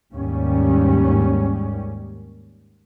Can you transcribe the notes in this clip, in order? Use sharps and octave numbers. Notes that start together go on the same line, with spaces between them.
D#2 G#2 G3 C#4